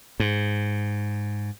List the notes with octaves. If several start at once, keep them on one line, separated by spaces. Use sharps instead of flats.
G#2